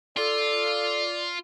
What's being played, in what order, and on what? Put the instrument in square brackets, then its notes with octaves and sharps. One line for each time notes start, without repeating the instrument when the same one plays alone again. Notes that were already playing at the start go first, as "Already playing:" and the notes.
[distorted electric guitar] F4 [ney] A4 [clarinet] D5